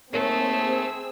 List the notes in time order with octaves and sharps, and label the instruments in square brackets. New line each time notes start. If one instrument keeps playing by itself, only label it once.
[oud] D#2 A#4 C#5 [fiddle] A3 [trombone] A#3 [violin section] C4 G#4 E6